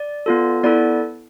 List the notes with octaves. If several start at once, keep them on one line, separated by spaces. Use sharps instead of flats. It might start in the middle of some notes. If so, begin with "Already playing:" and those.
Already playing: D5
B3 F4 A4
B3 E4 A4 D5